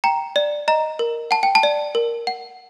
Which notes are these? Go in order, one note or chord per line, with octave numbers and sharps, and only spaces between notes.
G5 A#5
D5
D#5 A#5
A#4
F#5 A5
G5
A5
D5
A#4
F#5